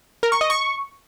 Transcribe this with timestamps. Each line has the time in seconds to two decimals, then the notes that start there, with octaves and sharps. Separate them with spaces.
0.23 A#4
0.32 C#6
0.41 D#5
0.50 C#6